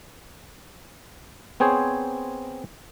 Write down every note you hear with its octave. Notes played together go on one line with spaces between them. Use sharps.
B3 C4 G#4 C5 C#5